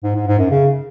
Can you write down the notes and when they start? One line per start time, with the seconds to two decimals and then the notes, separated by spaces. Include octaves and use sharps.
0.04 G#2
0.15 G#2
0.27 G#2
0.39 F#2
0.51 C#3